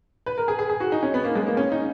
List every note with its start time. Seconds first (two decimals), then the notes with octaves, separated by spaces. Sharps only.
0.26 B4
0.38 A#4
0.48 G#4
0.59 G#4
0.70 G#4
0.80 F#4
0.92 D#4
1.03 C#4
1.14 B3
1.24 A#3
1.35 G#3
1.47 A#3
1.57 C#4
1.72 D#4